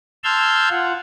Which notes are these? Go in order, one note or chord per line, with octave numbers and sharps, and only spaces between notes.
A5 C6 E6 F6 G6 G#6
F4 F#5